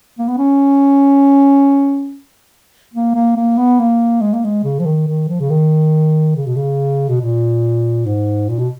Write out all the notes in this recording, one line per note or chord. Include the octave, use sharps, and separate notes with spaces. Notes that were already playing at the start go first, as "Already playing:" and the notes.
A#3
B3
C#4
A#3
A#3
A#3
B3
A#3
G#3
A#3
G#3
C#3
F3
D#3
D#3
F3
C#3
D#3
C#3
B2
C#3
B2
A#2
G#2
A#2
B2